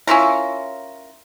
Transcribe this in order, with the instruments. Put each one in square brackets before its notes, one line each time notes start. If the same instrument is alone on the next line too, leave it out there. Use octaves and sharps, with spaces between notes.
[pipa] C#4 E4 F4 A#4